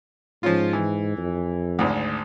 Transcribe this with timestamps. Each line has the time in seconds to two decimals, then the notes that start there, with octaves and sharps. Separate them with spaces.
0.43 G#2 F3 C#4 F4
0.73 E3
1.17 F2
1.79 G#1 D2